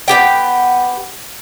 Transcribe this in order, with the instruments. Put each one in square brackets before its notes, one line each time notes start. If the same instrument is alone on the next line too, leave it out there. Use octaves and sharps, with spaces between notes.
[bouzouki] B3 G4 G5